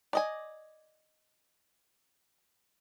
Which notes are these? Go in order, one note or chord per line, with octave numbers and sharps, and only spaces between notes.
D5 D#5 G#5